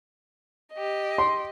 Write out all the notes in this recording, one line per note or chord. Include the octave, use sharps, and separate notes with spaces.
G4 D#5
C6